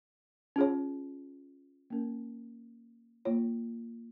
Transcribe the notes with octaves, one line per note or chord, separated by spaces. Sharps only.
C#4 F4 G#4 C#5
A#3 C#4 A#4
A#3 F4 C#5